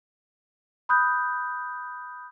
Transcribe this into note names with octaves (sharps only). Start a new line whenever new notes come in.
B5 D#6 F#6 G6